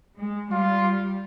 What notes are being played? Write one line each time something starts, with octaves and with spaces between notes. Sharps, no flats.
G#3
G3 F4